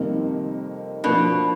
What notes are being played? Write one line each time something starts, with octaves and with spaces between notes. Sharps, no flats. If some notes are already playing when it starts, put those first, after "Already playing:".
Already playing: F2 C3 D#3 G3 A#3
B2 F3 A#3 D4